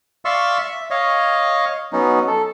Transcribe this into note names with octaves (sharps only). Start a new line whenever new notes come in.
D5 E5 F5 C6 C#6 E6
E5
C#5 D#5 F5
F#3 B3 C#4 D#4
A4